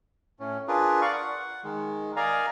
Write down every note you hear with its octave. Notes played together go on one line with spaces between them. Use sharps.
A2 C#4
D4 F4 G#4 A#4 B4
D5 F5 C#6
F#5
D#3 G#3
A#4 D5 D#5 F5 G#5 A#5